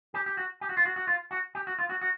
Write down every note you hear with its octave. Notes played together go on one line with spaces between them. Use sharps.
G4
G4
F#4
G4
F#4
F4
F#4
F#4
F4
F#4
G4
F#4
F4
F#4
F#4